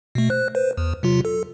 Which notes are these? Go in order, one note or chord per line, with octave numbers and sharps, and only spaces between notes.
B2 A3
C5 F#6
B4 C5
E2
C3 F#3 F4
A4